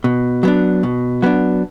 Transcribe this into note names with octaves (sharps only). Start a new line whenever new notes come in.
B2
F#3 B3 D4
B2
F#3 B3 D4